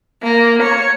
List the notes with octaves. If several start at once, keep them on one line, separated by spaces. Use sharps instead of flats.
A#3
C#5